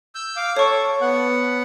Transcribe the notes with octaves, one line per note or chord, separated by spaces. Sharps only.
E6 G6
F5 D6
A4 C#5 C#6
B3 F#5